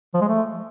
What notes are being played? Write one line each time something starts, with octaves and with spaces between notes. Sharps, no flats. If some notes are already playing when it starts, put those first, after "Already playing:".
F3
G#3
A3